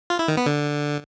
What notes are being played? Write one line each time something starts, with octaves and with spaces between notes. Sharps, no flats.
F4
E4
D#3
B3
D3